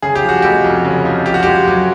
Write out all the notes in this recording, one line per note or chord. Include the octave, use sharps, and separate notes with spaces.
C#3 G#4
G4
F3
F#4
F1 G4
F2
C#3
F3
F3 G4
F#4
G#3 G4
F#2